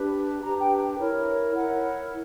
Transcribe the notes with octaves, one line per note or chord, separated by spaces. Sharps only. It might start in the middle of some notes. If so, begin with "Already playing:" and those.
Already playing: D4 G4 B4
D4 G4 B4 A#5
G5
E4 A#4 C#5
E4 A#4 C#5 F#5